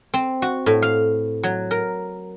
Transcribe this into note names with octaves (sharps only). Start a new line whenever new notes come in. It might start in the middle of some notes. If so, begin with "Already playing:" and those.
C4
F#4
A2
F5
F#3
A#4